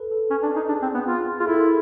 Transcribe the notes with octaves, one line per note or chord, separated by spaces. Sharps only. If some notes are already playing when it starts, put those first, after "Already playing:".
Already playing: A4 B4
A4
C#4
D4
D#4
D4 G#4
C4
B3
F4
F4 G#4
E4 A4
G#4 A#4